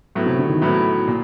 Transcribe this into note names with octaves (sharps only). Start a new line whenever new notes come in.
A2 F#3 B3 E4
C3
D3
D#3
A2 E3 F#3 B3 E4
A#2